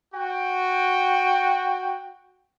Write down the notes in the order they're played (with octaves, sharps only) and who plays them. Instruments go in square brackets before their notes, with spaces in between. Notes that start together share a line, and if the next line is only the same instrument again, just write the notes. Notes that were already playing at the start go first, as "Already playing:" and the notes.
[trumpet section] F#4 G5